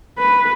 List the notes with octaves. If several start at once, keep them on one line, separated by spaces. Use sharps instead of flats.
B4